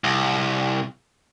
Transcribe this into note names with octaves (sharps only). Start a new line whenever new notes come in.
C2